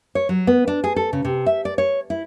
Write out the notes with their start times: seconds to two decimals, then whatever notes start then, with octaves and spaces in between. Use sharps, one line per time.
0.15 C#5
0.29 F#3
0.47 B3
0.68 D4
0.84 G#4
0.96 A4
1.13 C#3
1.25 C3
1.46 E5
1.65 D5
1.78 C#5
2.10 E4